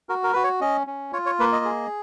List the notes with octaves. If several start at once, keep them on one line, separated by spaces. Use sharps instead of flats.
F#4 A#4
A#4
F#4 B4
C#5
C#4 D#5
C#4
F4 C#5
C#5
A#3 B4
D#5
G#4